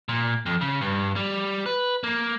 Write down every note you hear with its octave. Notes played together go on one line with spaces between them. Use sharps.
A#2
F2
C#3
G2
G3
B4
A#3